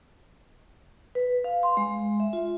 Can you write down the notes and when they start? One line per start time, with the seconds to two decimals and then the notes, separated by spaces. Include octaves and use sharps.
1.15 B4
1.44 F5
1.63 C6
1.77 G#3
2.20 E5
2.33 F4